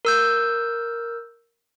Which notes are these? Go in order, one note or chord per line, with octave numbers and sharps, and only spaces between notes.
A#4 E6 G6